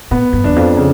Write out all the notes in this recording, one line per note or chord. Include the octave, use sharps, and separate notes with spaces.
A2 B3
G2
E2 D4
F2
C#3